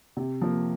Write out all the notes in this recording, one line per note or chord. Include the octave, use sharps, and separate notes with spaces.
C3
F3 A#3